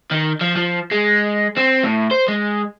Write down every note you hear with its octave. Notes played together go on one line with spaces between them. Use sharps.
D#3
F3
F3
G#3
C4
A2
C5
G#3